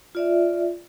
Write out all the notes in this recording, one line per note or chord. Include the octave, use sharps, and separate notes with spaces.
F4 D5 E5